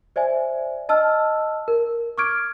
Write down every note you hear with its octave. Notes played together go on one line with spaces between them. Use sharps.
C5 D5 E5 G#5
D#5 A5 E6 F6
A#4
C#6 D6 F6 G#6 D7